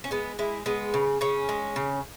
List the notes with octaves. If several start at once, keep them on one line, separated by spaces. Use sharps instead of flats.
C#4
G#3 B3
G#3 E4
G#3 B3
C#3
C#3 C#4
G#3
C#3